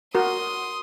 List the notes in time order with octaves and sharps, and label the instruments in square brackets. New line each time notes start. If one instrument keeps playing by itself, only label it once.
[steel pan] F#4 A#4 [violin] C6 D#6